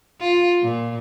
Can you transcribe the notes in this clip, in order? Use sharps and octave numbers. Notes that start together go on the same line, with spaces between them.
F4
A#2